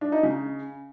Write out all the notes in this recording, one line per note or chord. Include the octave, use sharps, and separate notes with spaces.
D4
D#4
C#3